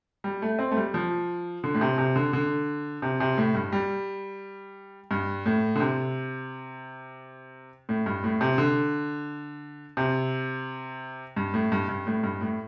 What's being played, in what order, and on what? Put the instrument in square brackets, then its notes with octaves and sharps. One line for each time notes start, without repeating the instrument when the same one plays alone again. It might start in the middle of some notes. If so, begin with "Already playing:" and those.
[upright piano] G3
A3
C4
A3
G3
F3
D3
A2
C3
C3
D3
D3
C3
C3
A2
G2
G3
G2
A2
D3
C3
A2
G2
A2
C3
D3
C3
G2
A2
G2
G2
A2
G2
A2